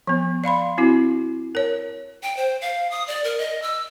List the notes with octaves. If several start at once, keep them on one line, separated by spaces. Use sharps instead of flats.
F3 B3
D5 F5 B5 C6
C4 E4 F#4
A#4 C#5
G5
C5
F5
D#6
D5
A#4
D#5
E6